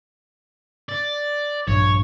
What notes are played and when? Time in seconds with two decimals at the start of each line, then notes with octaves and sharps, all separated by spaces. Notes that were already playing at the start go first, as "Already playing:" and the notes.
0.89 D5
1.68 A#1 G2 C#5